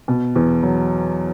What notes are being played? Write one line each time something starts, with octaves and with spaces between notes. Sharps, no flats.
B2
E2
F#3